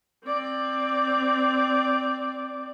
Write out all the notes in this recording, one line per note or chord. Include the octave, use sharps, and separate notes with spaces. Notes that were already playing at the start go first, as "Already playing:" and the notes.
C4 D5